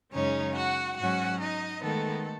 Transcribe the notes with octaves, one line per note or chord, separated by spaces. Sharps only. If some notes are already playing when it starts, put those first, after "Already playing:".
F#2 C#3 G#3 C#4 D#4 C#5
F#4 F#5
G#2 F#3 C#4 F#4 F#5
D#4 D#5
D#3 G#3 A3 B3 A4